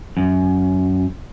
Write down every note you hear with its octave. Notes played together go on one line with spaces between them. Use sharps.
F#2